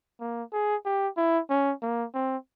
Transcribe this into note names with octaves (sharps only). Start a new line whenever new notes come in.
A#3
G#4
G4
E4
C#4
A#3
C4